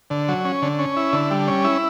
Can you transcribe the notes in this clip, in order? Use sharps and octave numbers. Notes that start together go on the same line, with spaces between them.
D3
F#3
C#4
D3
C#4
E4
D3
G3
C#4
E4